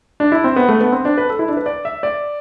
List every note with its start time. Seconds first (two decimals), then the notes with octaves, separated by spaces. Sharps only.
0.20 D4
0.32 E4
0.44 C4
0.56 B3
0.69 A3
0.81 B3
0.92 C4
1.05 D4
1.18 B4
1.30 A4
1.39 E4
1.48 D4
1.57 B4
1.66 D5
1.85 E5
2.03 D5